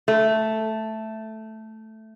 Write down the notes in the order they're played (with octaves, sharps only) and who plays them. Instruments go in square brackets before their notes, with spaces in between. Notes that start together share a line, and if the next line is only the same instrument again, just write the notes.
[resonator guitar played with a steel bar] A3